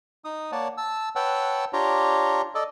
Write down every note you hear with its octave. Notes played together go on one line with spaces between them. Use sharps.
D#4 D#6
A#3 C#5 D5 F#5 A5
A5 E6
B4 C#5 F#5 G5 A5 E6
D4 F4 G4 C#5 A#5
A4 D5 D#5